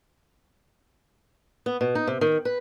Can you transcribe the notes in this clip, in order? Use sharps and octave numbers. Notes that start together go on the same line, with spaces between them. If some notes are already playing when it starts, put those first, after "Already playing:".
B3
B2
D#4
C3
D#3
B4